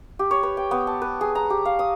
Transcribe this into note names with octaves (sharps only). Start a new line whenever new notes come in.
G4
C#5
B4
G5
B3
A5
B4
G#4
A#5
G4
F5
D#6